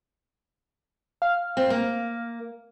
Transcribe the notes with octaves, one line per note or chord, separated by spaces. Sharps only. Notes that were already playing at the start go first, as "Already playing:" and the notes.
F5
C4
A#3